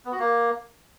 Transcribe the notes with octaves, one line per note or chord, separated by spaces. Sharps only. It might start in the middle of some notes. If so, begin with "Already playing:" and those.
B3
F#4
A#3